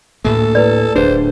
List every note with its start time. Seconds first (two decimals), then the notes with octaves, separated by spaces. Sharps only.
0.25 D2 A2 A#3 A4
0.55 E4 B4 D5
0.96 D1 D4 G#4 B4 C5